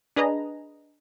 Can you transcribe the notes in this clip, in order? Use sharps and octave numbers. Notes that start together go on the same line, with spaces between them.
D4 G#4 B4 D#5 A#5